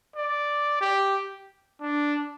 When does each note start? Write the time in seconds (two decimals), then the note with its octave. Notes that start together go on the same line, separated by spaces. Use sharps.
0.16 D5
0.81 G4
1.81 D4